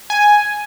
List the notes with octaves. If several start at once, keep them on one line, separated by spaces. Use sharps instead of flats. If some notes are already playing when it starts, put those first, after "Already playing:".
G#5